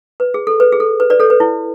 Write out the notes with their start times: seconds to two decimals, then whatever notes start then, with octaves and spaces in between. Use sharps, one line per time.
0.20 B4
0.34 G#4
0.47 A4
0.60 B4
0.72 G#4
0.80 A4
1.00 B4
1.10 B4 D5
1.20 A4 C#5
1.30 B4
1.40 E4